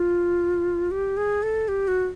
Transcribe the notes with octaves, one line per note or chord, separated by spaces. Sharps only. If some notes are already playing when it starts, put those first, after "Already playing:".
Already playing: F4
G4
G#4
A4
G4
F#4